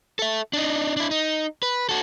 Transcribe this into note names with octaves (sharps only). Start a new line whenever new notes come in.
A4 E5
D4 D#4
D4 E4
D#4
B4
F#4 A4